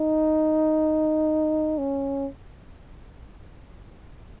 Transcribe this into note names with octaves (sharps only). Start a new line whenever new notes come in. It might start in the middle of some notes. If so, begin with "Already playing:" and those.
Already playing: D#4
C#4